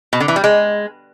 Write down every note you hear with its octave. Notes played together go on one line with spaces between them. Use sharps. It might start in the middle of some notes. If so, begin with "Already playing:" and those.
B2
D3
E3
G3
G#3